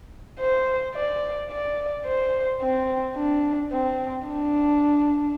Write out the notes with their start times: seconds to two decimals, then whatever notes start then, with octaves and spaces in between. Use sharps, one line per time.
0.40 C5
0.95 D5
1.51 D5
2.06 C5
2.61 C4
3.16 D4
3.71 C4
4.28 D4